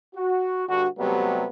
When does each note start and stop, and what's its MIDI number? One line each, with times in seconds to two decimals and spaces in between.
0.15 0.64 66
0.69 0.87 43
0.69 0.87 50
0.69 0.87 66
0.98 1.46 48
0.98 1.46 54
0.98 1.46 55
0.98 1.46 57
0.98 1.46 59